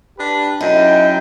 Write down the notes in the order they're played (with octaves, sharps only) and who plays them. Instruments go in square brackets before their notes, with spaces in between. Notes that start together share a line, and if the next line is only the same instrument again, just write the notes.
[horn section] D4 G4 B4
[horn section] F#2 E4 G5 [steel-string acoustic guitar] D#4